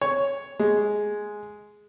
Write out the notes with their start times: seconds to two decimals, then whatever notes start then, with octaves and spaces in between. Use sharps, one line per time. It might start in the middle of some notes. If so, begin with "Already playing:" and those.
0.02 C#5
0.59 G#3